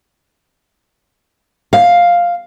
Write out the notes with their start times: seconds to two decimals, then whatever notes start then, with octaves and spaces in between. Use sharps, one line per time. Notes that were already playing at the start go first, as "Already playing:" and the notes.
1.73 F5